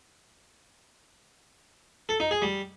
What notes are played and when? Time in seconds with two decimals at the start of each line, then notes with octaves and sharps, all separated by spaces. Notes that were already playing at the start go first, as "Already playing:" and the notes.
2.09 A4
2.20 D#4
2.31 G#4
2.42 G3